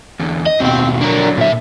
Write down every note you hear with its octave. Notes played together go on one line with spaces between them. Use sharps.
E2 D3
D#5
D#2 B2 C4 G5
D3 F#3 D4 A#4
A#2 E5